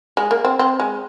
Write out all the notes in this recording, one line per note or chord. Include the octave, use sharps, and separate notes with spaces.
G#3
A#3
C4
C4
G#3